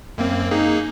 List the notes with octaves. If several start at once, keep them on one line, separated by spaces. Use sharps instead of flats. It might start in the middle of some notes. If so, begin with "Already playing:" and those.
F#2 A#3 C4
A#3 D#4 G#4